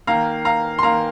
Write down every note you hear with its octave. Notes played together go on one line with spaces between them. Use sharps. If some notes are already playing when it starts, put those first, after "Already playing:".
D#3 A#3 F5 A#5
F5 A#5
C6
D#3 A#3 F5 A#5